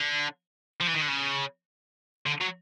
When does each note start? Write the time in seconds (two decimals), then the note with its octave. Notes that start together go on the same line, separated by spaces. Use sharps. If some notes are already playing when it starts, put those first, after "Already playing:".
Already playing: D3
0.80 F3
0.87 E3
0.94 D#3
1.01 D3
1.08 C#3
2.26 D3
2.41 F#3